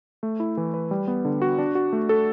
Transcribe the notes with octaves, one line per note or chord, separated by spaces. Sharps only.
A3
E4
E3
B4
G3
B3
D3
F#4
D4
F#4
A3
A4